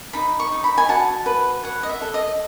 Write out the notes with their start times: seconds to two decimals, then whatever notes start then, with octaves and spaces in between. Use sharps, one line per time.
0.13 D#4 B5
0.40 C#6
0.52 D#4
0.64 B5
0.78 G#5
0.89 F#4 A5
1.26 B4
1.63 C#5 F#5
1.83 D#5
1.89 E5
2.02 A4
2.14 D#5